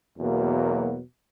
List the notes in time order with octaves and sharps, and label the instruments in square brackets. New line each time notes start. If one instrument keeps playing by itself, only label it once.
[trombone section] E2 B2 F#3 A#3